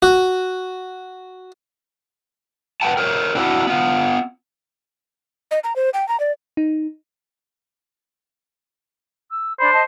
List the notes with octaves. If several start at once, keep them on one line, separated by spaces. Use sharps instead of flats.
F#4
B4 F#5 G5 A5
A#4 C5 C#5
C4 D4 E4 F#4
B3 F4
D#5
A#5
C5
G5
A#5
D5
D#4
E6
D4 C5 D5 B5
D#5 A5